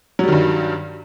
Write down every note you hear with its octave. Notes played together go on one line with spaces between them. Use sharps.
G2 D#3 F#3 G3